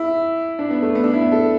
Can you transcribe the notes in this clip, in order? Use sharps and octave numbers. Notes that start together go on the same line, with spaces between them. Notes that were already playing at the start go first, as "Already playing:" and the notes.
Already playing: E4
D4
B3
A3
B3
D4
E4
B3
A4